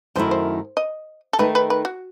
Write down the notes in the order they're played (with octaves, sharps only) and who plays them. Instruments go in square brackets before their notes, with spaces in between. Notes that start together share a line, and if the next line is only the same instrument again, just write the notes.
[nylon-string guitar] F#2 D#3 A3 E4 [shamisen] C5
[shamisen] C5
D#5
A4
[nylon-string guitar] D#3 A3 D#4 [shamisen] B4
[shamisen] B4
B4
F#4